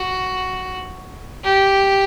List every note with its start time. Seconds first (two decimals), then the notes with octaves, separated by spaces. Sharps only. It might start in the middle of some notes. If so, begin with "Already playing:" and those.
Already playing: F#4
1.44 G4